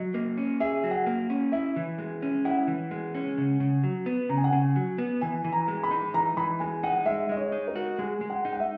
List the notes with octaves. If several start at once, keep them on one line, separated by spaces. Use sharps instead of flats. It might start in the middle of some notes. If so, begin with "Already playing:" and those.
Already playing: F#3 D#5
A#3
C#4
G#4 E5
F#3
F#5
A#3
C#4
E4 E5
E3
G#3
C#4
E4 F#5
E3
G#3
C#4
C#3
C#3
F#3
B3
C#3 A#5
G#5
F#5
C#3 G#5
F#3
B3
E3 G#5
E3
A#5
G#3
B5
D#4
E3 A#5
E3 B5
G#3 G#5
D#4 F#5
G#3 E5
G#3 D#5
C#5
D#4
A#4
F#4
G#3 G#4
G#3
F#5
D#4
F#5
E5